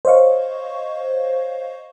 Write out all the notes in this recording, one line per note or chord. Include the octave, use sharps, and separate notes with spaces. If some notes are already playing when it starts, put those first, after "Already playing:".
C5 C#5 D#5 F5 C#6